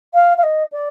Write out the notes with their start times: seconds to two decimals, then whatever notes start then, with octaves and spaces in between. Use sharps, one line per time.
0.14 F5
0.38 F5
0.43 D#5
0.72 D5